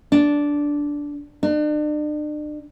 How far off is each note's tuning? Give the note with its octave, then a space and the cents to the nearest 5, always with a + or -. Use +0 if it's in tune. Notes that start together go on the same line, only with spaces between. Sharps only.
D4 -10
D4 +40